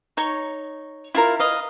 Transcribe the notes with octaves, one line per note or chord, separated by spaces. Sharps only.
D#4 C#5 C#6
E4 F4 A#4
B4 D#5 F5